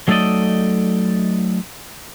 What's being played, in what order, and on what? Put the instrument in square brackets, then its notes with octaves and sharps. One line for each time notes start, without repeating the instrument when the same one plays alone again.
[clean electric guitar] F#3 A3 D#4 A4 D5 D#5